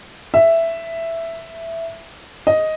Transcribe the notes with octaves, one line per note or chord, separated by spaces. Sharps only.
E5
D#5